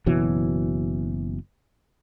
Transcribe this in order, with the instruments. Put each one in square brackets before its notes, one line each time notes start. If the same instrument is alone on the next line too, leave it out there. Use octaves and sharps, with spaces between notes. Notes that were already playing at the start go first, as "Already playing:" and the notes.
[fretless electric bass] F#1 B2 E3 F#3